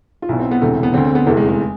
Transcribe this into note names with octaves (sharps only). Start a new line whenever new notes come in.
F4
B1 B2 E4
C4
B3
E1 D2 C3 E3 A3
B3
D2 D3 C4
C4
B3
F1 E2 C3 E3 A3
G#3
G#3